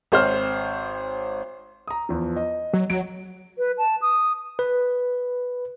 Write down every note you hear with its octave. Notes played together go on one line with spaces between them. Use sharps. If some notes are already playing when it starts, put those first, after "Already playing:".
G#1 C4 C5 C#5 F6
A#5 D#6
E2 F3
D#5
F#3
F#3 D7
B4
A5
D#6
B4